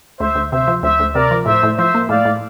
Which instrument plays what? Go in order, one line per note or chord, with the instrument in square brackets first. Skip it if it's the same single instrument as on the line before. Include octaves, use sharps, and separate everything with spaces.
[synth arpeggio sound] D2 [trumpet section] C5 E5
[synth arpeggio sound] D2
[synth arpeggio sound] C3 [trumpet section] C5 E5
[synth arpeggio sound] F3
[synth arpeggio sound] D2 [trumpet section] C5 E5
[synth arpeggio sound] D2
[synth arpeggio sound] C3 [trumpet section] A#4 D5
[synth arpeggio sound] F3
[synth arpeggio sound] A2 [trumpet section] C5 E5
[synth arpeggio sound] A2
[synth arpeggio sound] F3 [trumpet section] C5 E5
[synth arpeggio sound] A#3
[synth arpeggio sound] A2 [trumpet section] D5 F5
[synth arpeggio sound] A2